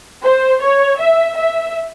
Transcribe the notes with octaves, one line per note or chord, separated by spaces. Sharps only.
C5
C#5
E5
E5